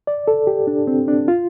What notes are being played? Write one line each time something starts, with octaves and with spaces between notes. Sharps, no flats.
D5
A4
G4
D4
C4
D4
F4